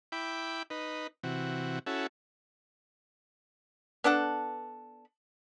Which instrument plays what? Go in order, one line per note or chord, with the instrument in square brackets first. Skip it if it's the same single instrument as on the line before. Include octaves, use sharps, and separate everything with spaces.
[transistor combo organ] E4 G5 B5 D6
D#4 B4
C3 E3 F#4
C#4 E4 F#4 A4
[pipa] B3 D4 A4 F#5